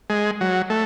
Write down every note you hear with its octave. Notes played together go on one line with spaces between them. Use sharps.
G#3
F#3
A3